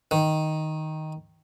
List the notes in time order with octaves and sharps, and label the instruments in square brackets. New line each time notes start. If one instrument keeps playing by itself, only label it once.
[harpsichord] D#3